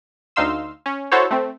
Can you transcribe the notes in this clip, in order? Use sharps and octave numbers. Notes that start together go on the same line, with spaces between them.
D2 D#4 F5 C6 E6
C#4
E4 F#4 A4 C5 C#5
A3 C4